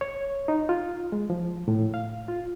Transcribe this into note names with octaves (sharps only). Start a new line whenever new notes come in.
C#5
D#4
F4
G#3
F3
A2
F5
F4